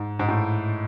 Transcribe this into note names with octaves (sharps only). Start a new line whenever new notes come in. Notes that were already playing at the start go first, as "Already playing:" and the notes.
Already playing: G#2
G#2
A2